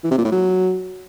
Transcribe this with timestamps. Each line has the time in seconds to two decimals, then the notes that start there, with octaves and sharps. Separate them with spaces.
0.04 E3
0.11 C3
0.18 A#2
0.25 A2
0.32 F#3